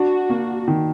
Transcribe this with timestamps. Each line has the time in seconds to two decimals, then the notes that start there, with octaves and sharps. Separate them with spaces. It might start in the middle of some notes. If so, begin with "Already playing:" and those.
Already playing: D4 F#4
0.30 A#3
0.68 D#3